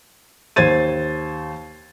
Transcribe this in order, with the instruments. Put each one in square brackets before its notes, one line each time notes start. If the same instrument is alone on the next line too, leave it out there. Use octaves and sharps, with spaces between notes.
[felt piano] D#2 C5 G#6 A6 D#7